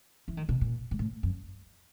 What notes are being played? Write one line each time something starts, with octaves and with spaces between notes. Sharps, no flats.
E3
D#3
B2
A#2
G#2
A2
F#2